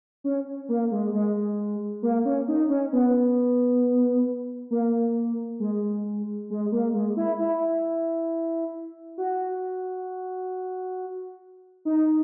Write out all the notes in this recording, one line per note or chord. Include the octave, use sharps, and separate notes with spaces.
C#4
A#3
G#3
G#3
A#3
C#4
D#4
C#4
B3
A#3
G#3
G#3
A#3
G#3
E4
E4
F#4
D#4